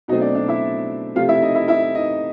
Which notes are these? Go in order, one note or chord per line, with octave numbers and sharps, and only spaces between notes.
B2 F#3 A3 C4 D#4 D#5
D4 D5
D4 D5
E4 E5
C3 F3 A3 F4 F5
E4 E5
D#4 D#5
E4 E5
E4 E5
D#4 D#5